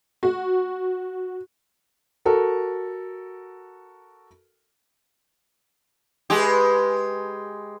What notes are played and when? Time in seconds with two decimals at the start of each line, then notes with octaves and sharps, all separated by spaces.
0.23 F#4
2.25 F#4 A4 A#4
6.30 G#3 G4 B4 G#5 C6